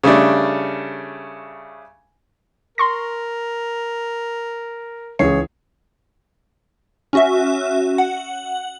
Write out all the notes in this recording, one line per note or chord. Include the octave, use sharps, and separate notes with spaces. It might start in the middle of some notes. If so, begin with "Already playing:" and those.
C#3 G3 A3 D4
A#4 C6 C#6 A#6
C#2 E3 G#4 C#5 C7
C#4 F#4 E5
F#5